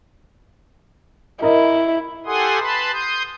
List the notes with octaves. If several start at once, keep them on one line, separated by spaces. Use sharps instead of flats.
E4 A#4 D#5
G4 A4 F#5 G#5 C6 D#6
B4 A5 B5 C6
C6 D#6 G6